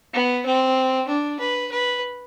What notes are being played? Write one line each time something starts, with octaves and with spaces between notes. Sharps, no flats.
B3
C4
D4
B4
B4